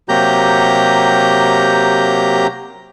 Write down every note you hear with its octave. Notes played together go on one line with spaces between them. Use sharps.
C3 F#3 A#3 G4 A#5 G6